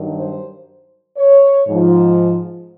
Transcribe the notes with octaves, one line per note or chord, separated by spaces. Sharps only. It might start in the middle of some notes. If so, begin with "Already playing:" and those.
Already playing: G2 D#3 F#3
C5
C#5
G#2 F3